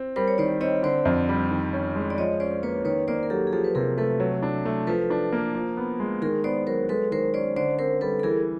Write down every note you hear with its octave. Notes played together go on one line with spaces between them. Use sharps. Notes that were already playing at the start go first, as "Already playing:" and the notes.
Already playing: C4
G3 A#4 C5
C#5
D#3 C5 D5
C4 C#5 D#5
D3 C5 D5
F2
G3
D#3
C#4
G#3
D5
F3 C#5 D#5
C#4 C5 D5
A#3 B4 C#5
D#3 B4 C#5
A#3 C5 D5
A#4
F#3 G4 A4
G#4
F3 G4 A4
B4
C3 G#4 A#4
A3 A4 B4
F#3
D4
A3
F3 A4 B4
D4
A#3
F3
B3
G#3
D#3 G#4 A#4
B3 C5 D5
F#3 A#4 C5
G#3 A4 B4
D#3 A#4 C5
C#4 C5 D5
D3 C5 D5
C4 A#4 C5
G3 A4 B4
A4
E3 G#4 A#4